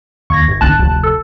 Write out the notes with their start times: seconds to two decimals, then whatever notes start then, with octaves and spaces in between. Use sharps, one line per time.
0.30 D#2 C#6 G#6 A#6
0.47 G1
0.61 C4 D#4 A5 F#6
0.79 F1 D2
1.03 A4